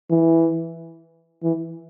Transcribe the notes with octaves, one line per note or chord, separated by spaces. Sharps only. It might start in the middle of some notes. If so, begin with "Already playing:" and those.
E3
E3